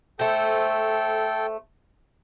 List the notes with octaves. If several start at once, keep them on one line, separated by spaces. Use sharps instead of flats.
A3 A4 C5 G5